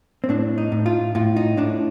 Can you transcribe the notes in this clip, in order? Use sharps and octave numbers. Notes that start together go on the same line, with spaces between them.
C4
A2 D4
D#4
A2
F4
A2 F4
D#4
A2 D4